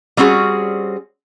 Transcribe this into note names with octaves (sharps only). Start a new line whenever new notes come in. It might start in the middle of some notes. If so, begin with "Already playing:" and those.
G3 C4 C#4 F#4 G#4